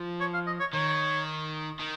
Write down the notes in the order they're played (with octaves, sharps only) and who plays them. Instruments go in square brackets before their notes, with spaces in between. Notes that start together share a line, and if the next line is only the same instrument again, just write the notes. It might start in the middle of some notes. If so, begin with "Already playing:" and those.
Already playing: [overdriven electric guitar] F3
[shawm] C#5
F5
D#5
C#5
[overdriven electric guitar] D#3 [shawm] C#5
[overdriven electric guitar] D#3